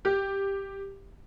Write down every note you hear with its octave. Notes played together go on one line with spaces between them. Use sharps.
G4